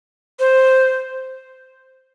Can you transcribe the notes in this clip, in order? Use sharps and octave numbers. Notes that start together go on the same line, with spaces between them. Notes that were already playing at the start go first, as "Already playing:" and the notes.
C5